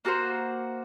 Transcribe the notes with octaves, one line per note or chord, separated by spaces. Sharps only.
A#3 F#4 A#4 C5